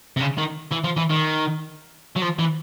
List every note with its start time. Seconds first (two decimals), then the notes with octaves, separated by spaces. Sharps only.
0.17 C3
0.20 C#3
0.38 D#3
0.71 E3
0.84 F3
0.97 E3
1.10 D#3
2.16 F#3
2.23 F3
2.39 E3